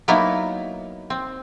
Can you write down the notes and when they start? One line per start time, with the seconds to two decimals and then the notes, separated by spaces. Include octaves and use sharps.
0.08 F#3 A#3 B3 D#4 E4
1.10 C4